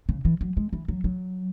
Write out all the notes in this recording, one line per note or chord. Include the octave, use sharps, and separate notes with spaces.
C#3
E3
F#3
G#3
E3
F#3
F#3